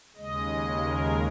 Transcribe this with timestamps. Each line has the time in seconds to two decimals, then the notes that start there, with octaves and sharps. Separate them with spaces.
0.16 D#2 C#3 G#3 D#5
0.82 A#4